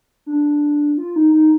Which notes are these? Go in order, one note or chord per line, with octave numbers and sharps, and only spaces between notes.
D4
F4
D#4
D#4